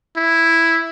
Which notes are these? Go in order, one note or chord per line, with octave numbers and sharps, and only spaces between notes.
E4